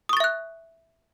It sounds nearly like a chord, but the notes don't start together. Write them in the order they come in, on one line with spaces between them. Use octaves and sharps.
D#6 C#6 A6 E5 F#6